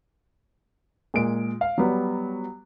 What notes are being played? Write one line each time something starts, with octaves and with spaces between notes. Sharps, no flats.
A#2 G#3 D7
F5
F#3 G3 B3